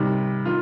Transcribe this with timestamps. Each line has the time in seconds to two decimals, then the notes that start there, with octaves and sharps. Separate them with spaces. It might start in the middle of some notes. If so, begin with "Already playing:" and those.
Already playing: C3 D#3 G3
0.46 D#3 F4